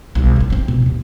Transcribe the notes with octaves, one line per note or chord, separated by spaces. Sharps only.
B1 G3
G1 G2
B3 C4
B2
D#2 A#2